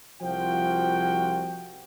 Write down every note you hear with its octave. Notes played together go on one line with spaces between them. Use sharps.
C2 F3 F4 F#4 G5